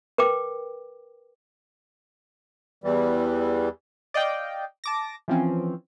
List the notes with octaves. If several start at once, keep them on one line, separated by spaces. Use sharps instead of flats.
A#4 B4 G5 D6
E2 E3 G3
D5 D#5 F5 G5
A5 D6 A#6
E3 F3 C4 C#4